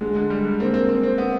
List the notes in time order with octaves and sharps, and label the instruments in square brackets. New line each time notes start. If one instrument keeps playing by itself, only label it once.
[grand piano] D3 [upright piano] G#3
[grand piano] D3
G3
D3
[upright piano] A#3 [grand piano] C4
[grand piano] C4
C4
C4
B3